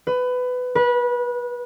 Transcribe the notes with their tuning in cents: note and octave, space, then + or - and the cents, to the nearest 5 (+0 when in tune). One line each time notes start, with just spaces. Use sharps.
B4 +20
B4 -25